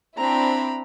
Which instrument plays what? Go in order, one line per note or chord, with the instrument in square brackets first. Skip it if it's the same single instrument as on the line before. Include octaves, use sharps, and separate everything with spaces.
[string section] C4 D4 E4 [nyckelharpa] A#5 B5